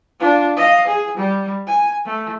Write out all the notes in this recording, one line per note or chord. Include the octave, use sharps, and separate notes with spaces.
D4 F4
D#5 F5
G#4
G3
G#5
A3